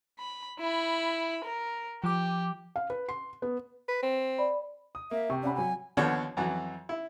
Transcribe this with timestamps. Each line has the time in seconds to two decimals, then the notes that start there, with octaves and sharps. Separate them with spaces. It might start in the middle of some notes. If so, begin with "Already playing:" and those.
0.20 B5
0.59 E4 B5
1.45 A#4
2.04 F3 G4 D6
2.76 F5
2.90 B4
3.09 C6
3.42 B3
3.88 B4
4.03 C4
4.38 D5 B5
4.95 D#6
5.11 A#3 E5
5.30 C3 G5 C#6
5.43 C#4 D5 F#5 B5
5.56 F#3 G#5 B5
5.97 D#2 D3 F3 B3 C#5
6.37 F2 E3 F#3
6.89 E4